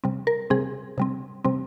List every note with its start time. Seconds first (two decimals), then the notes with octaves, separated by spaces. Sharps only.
0.04 C3 G3 C4
0.27 A#4
0.50 C3 G3 C4 G#4
0.98 C3 G3 C4
1.44 C3 G3 C4